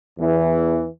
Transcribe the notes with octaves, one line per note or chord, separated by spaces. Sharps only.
E2 E3